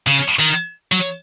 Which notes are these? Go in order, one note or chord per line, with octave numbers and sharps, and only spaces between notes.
C#3
D#3
F#3